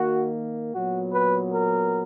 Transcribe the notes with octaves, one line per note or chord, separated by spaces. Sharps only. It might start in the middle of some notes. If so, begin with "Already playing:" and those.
Already playing: D#3 A#3 F#4
A#2 F#3 B3 F#4
B4
A#4